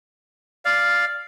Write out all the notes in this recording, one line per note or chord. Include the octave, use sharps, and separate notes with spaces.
D5 F5